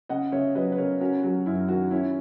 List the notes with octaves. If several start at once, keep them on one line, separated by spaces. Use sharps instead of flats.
C#3 D#5 F#5
C#3 C#5 E5
F#3 B4 D#5
B4
C#3 A#4 C#5
C#4 F#4 A#4
F#3 F#4
F#2 E4
D#3 F#4
C#4 E4